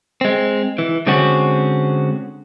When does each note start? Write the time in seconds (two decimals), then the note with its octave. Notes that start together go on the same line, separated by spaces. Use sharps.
0.21 G#3 C4
0.78 E3
1.07 D3 G#3 C4 C#4 F#4